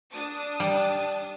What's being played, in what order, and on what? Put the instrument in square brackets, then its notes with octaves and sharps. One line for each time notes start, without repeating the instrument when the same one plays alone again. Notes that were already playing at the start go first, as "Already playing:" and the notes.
[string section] D4 A5 D#6
[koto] G3